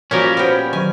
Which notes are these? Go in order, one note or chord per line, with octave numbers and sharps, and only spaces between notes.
A#2 F3 G3 C#4 F#4 A#4 C#5
B3 F#4 C5 C#5 G5
D#3 F#3 G#5